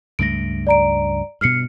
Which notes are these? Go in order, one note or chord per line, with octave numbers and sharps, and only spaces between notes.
C#2 G2 A3 A#6 D7
D5 A#5 D7
G2 B2 F6 C7 C#7